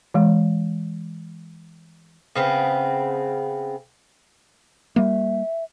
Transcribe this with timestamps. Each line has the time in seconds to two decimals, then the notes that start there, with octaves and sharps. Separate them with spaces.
0.14 E3 G#3
2.36 C#3 B3 C4
4.96 G3 A#3 E5